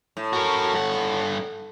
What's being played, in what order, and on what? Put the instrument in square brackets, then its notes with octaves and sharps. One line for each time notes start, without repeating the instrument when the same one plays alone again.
[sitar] A2
[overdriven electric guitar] F#4 A#4
G2 F#5